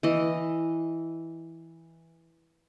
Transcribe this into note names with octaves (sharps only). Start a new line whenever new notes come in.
E3 D#5